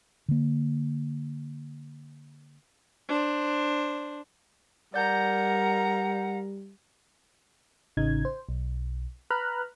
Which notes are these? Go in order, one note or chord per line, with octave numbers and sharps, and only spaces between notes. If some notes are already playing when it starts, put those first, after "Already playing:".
D3 A#3
D4 C5
G3 A#4 D5 F#5 A#5 G6
A1 C#3 D#4 G#6
C5
B1
B4 A#5 B5 F6 F#6